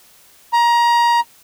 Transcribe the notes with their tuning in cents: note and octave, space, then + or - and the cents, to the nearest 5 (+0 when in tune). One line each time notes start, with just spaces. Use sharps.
A#5 +25